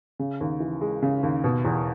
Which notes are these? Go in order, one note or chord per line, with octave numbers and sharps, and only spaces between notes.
C#3
D#2
E3
G#3
C#3
D#2
B2
E2